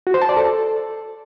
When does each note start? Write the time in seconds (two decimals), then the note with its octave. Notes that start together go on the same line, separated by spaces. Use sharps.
0.07 F#4
0.14 C5
0.22 A5
0.29 D5
0.37 A4